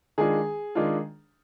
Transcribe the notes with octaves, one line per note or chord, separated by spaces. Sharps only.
D#3 G#3 D4 F4 G#4
D#3 G#3 D4 F4